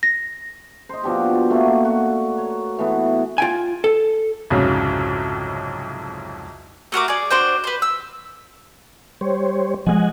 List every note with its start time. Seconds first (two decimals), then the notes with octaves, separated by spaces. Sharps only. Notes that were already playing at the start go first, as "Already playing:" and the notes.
0.03 A#6
0.89 C5 D#5
1.03 B2 F3 D4 G4
1.50 A3 A#3 F#4
1.85 F#4
2.38 C#5
2.79 E3 A3 B3
3.38 F4 G5 G#5
3.84 A4
4.50 C2 F2 G#2 C#3 F#3
6.92 A3 F#4 A#4 D6
7.08 G#4 D5
7.30 D4 F#4 C5 G5
7.64 B4 C5
7.82 E6
9.21 G3 C5 C#5
9.87 F3 F#3 G#3 D#5 F#5 G#5